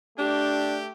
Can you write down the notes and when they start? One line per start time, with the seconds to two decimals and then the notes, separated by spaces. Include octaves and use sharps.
0.18 A3 D4 G4